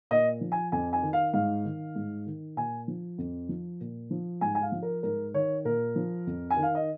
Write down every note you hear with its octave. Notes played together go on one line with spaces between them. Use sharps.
A#2 D#5
F3
G#5
F2 G#5
G#5
D#3
F5
G#2 F5
D#3
G#2
D#3
A#2 G#5
F3
F2
F3
A#2
F3
G#2 G#5
G#5
F5
F3
A#4
G#2 A#4
D#3 C#5
A#2 A#4
F3
F2
G#5
D#3
F5
D#5